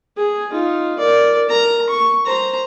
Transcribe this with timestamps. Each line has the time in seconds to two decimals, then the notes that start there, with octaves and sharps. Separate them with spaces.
0.17 G#4
0.51 D#4 F4
0.99 A#4 D5
1.48 A#4 A#5
1.89 C#6
2.26 C5 A#5